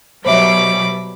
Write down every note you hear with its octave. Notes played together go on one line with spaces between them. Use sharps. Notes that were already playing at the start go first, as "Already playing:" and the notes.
B2 F#3 G3 C5 C#5 E5 B5 D6